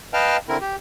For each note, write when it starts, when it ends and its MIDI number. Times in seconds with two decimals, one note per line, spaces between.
0.14 0.37 71
0.14 0.37 75
0.14 0.37 77
0.14 0.37 79
0.14 0.37 81
0.14 0.37 89
0.49 0.57 50
0.49 0.57 60
0.49 0.57 64
0.49 0.57 70
0.61 0.76 67